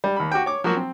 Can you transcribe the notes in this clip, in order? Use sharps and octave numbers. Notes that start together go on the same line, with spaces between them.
G3
D#2 B5
F#4 G4 G5
C#5 D6
F3 F#3 A#3 F#4
C4